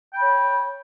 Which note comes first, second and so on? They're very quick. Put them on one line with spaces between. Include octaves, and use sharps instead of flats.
G5 B5 C#5